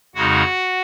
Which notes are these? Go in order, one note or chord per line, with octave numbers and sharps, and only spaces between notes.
F2 C#3 G#3 D#4 F#4 F#5